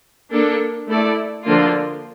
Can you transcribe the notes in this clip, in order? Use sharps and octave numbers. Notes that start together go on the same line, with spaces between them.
A#3 D4 A4
A3 E4 A4 D5
D3 F3 A#3 D4 F4